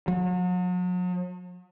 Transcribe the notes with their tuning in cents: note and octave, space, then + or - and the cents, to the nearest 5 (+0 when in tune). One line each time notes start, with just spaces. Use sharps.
F#3 -40